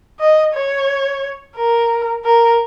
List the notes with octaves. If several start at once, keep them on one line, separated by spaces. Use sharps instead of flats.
D#5
C#5
A#4
A#4